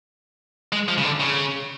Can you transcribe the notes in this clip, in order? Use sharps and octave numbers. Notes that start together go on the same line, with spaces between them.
G#3
F3
C#3
D3
C#3